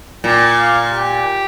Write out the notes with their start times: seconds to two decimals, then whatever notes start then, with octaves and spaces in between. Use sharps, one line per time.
0.24 A#2 G5
0.58 F5
0.92 G4